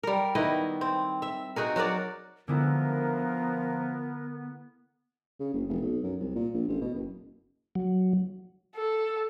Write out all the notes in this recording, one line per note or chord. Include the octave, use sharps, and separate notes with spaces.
G3 A#4
D#3 B3 E4 D#5
C4
E5
D#4 F#4 G#4 A#4
F#3 F#4 A#4 D5
D3 F3 G#3 B3 E4 A#4
C#3
F#1
F1
B1
F#2
C2
A#2
A#1
A1
B2
F#1
F#3
A4